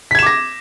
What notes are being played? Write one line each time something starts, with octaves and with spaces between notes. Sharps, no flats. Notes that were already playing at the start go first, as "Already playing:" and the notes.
D6 G#6 A#6 B6 E7